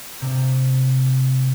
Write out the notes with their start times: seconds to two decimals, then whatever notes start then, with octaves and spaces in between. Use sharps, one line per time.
0.21 C3